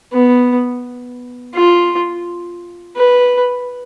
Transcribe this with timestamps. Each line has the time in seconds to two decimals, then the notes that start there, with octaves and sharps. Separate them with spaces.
0.13 B3
1.54 F4
2.96 B4